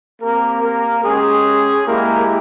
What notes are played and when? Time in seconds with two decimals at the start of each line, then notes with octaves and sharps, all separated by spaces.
0.22 A#3 C4 G4 A#4
0.63 A#3 A#4
1.04 G#3 C#4 G4 G#4
1.87 G#3 A#3 E4 G4 A#4